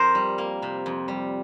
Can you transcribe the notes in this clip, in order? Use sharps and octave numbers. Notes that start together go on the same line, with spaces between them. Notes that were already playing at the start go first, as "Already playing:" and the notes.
Already playing: F2 A#4 C5
G3
A#3
C3
F2
G3